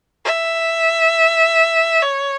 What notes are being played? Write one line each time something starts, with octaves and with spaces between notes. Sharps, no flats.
E5
C#5